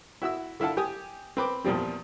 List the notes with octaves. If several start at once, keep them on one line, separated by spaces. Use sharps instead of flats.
E4 F#4 E5 E6
D3 E4 F4 F#5 A5
G4 G#5 D#6
C4 B4 D6
E2 A#2 F3 G3 C4